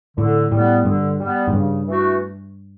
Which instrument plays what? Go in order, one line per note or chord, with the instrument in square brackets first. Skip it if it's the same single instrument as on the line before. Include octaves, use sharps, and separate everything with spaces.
[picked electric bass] A2 [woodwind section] D3
[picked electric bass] A2 [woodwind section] G3 B3
[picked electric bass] G2 [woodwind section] D3
[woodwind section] G3 B3
[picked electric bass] G#2
[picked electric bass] G2 [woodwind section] C#3
[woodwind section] E3 A3 D4 F#4